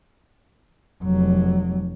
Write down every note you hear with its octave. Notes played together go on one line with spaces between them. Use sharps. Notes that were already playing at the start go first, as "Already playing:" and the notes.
F1 F#3